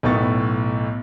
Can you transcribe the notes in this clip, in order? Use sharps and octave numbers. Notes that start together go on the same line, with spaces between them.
B1 A2 B3 C#6 A6